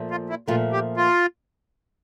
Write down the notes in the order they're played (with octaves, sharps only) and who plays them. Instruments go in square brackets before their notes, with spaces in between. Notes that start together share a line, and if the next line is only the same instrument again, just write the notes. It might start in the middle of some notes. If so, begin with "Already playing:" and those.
Already playing: [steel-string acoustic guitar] A#2 F3 A3
[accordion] F4
E4
[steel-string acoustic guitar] A#2 F3 A3 [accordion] F4
[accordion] G4
F4